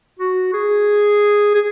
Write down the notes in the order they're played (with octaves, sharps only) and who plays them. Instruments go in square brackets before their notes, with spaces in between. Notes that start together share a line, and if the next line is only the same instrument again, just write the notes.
[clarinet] F#4
G#4
G#4